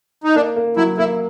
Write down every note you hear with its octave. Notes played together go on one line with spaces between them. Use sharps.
D#4
A#3 D4
A#3
F#3 E4
A#3 E4